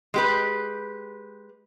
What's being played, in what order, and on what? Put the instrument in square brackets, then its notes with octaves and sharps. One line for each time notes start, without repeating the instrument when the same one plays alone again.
[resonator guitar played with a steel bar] G#3 G4 B4